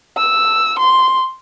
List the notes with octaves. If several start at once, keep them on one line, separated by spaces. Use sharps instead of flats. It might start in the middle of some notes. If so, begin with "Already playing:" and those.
E6
C6